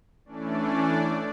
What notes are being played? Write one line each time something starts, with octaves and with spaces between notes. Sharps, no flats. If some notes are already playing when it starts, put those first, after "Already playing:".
E3 A3 C#4 D4 D5